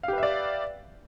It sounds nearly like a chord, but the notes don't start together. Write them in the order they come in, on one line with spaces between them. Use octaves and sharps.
F5 G4 B4 E5 D5